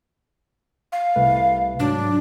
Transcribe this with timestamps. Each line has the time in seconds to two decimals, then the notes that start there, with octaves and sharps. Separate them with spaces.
0.92 F5
1.16 C2 A3 B4
1.80 G#2 F#3 D4